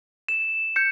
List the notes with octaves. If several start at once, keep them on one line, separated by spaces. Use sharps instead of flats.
E7
G6 C#7